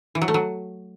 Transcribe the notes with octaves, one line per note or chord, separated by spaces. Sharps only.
E3
F#3
A3
F#3